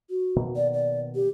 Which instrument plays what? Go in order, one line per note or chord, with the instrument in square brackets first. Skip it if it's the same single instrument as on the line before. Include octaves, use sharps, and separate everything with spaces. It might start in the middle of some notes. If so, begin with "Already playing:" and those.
[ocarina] F#4
[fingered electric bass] B2 D#3 A#3
[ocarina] D5
D5
G4